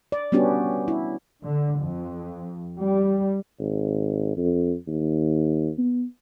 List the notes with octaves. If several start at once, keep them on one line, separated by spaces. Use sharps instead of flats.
D5
G3 B3 C#4 D4 F#4 G4
E4
D3
F2
G3
G#1
F2
D#2
B3